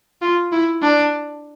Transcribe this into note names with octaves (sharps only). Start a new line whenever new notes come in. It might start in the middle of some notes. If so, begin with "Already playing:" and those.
F4
E4
D4